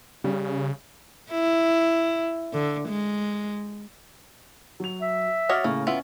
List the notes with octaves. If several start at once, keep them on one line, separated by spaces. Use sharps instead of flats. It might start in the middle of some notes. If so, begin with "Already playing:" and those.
C#3 G3
E4
D3
G#3
F#3 F7
E5
F#4 C#5 D#5 D6 F6 A6
A2 C#3 A#3 C#6
B3 C#4 E4 F4